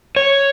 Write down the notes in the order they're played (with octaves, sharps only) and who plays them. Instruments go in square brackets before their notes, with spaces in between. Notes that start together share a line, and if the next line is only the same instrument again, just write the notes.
[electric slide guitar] C#5